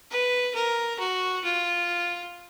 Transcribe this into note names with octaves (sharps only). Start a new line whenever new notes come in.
B4
A#4
F#4
F4